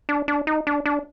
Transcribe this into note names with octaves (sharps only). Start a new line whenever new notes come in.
D4
D4
D#4
D4
D4